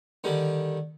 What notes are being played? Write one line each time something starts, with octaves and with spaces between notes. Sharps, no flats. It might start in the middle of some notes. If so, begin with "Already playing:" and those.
D3 D#3 G3